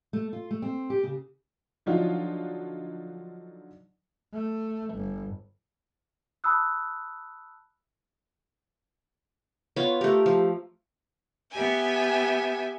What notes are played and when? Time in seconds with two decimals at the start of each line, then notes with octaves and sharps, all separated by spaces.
0.13 A3
0.33 F4
0.51 A3
0.62 C4
0.90 G4
1.03 C#3
1.86 D3 F3 F#3 D4 D#4 F4
4.33 A3
4.94 G1
6.44 A5 B5 D#6 E6 F#6
9.76 B3 F4 C#5
10.01 A3 G4 A#4
10.26 F3
11.52 B3 G4 E5 G#5